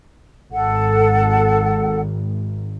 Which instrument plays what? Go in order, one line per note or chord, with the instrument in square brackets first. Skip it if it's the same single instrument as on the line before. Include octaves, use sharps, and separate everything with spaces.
[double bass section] G#1 [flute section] A4 F#5